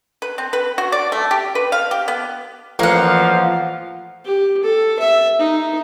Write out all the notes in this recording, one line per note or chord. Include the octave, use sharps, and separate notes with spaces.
B4
C4
B4
F#4
D5
A3
G4
B4
F5
G4
B3
A1 F3 A#3 F5 F#5
G4
A4
E5
D#4